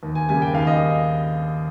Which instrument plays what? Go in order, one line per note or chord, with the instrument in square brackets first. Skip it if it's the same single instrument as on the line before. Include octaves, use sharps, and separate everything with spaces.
[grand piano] D#2
G#5
C#3 G3 A#3 G#5
G5
D#2 F5
D#5